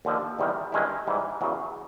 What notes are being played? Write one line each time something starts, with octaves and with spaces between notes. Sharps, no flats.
D#2 D3 F3
E2 C3 D#3 G3
G2 D#3 G#3 C#4 E4
G#2 E3 G3
E2 C#3 F#3